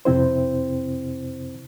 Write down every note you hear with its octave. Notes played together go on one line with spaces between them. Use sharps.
F2 C3 C4 E4 C5